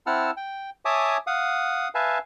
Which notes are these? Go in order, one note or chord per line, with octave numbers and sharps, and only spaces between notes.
C4 E4 F#5 A5 E6 F6
G5
C#5 E5 G#5 A5 D6 D#6
F5 F#5 D#6
B4 E5 F5 G#5 A5